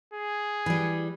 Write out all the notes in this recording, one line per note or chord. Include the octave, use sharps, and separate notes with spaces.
G#4
E3 G3